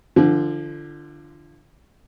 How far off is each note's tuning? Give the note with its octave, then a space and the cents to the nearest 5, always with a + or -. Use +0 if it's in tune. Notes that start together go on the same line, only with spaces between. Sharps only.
D3 +15 F3 -25